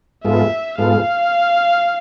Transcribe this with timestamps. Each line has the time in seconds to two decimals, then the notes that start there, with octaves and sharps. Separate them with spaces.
0.25 G#2 G#3 B3 F4 A4 E5
0.78 G#2 G#3 B3 F4 A4 F5